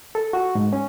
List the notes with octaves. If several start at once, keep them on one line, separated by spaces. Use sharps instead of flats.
A4
F#4
G#2
C#4